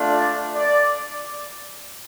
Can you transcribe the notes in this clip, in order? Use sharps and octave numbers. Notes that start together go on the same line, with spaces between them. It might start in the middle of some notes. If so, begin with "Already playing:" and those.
Already playing: A3 D4 F4
D5
D5